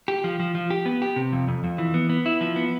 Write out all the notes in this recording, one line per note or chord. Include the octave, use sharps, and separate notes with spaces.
G4
F3
F3
F3
G4
B3
G4
C3
F2
F2
F2
E3
B3
B3
E4
F3
B3